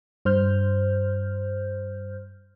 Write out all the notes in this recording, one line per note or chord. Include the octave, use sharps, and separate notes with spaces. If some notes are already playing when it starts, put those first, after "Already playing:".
G2 C5 F6 G6